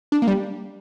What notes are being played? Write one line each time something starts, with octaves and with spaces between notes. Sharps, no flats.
D4
A#3
G3